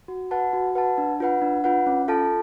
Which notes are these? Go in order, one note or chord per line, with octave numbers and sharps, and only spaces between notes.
F#4
B4 F#5 A5
F#4
B4 F#5 A5
D4
F4 B4 F#5
D4
F4 B4 F#5
C#4
F4 A4 F5 A5